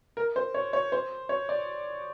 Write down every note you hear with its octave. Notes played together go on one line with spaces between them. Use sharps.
A#4
C5
C#5
C#5
C5
C#5
D5